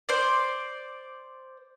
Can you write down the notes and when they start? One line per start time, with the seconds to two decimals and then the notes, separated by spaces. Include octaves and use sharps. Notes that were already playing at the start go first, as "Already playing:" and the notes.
0.09 C5 D5